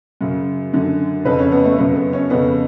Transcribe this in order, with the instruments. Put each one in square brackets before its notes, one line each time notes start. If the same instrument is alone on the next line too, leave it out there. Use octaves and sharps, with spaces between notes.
[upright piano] F#2 C#3
F#2 D3
F2 C#3 B4
C#4
B3
A3
F#2 C#3 B3
B3
C#4
F2 C#3 B3